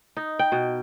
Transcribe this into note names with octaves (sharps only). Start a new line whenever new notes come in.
D#4
G5
B2